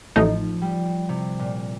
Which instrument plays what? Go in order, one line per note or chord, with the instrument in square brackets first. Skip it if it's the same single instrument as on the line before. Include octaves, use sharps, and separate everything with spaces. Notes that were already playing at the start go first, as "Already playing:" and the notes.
[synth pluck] A1 A2 A3 D#4 [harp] F3
[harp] G3
C3
A#2